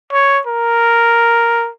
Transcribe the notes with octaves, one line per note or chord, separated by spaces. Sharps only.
C#5
A#4